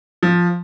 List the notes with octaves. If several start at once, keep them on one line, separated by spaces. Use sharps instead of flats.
F3